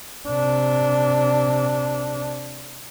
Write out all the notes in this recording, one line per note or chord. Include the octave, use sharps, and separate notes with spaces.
C3 D4